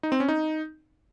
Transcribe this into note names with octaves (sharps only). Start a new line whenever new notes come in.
D#4
C4
C#4
D#4